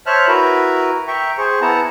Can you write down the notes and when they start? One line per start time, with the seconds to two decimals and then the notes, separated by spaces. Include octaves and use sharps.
0.06 C5 C#5 E5 A5 F6 F#6
0.28 E4 F#4 A#4 B4 A#5
1.08 E5 G5 A#5 C#6
1.38 G#4 C5 C#6
1.61 B3 E4 F#5 A5 A#5